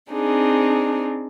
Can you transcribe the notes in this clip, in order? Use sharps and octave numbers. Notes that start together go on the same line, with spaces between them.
C4 D4 D#4 G#4